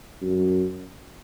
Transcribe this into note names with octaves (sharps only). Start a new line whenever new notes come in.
F#2